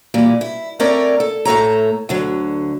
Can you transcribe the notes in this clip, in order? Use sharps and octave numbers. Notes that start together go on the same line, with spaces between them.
A#2 E3 G3
E4
A3 C4 C#4 A#4 C#5 D5
A4
A2 A3 A4 C#5 A#5
D2 D3 F#3